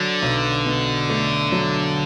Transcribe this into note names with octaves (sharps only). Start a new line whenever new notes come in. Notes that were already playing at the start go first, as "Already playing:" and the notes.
Already playing: D3 F#3
B1
B2
A3
F#3